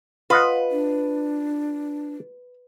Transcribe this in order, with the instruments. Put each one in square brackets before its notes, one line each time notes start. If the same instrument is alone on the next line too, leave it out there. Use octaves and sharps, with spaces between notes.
[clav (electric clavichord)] F4 D#5 F#5 [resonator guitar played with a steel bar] B4
[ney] D4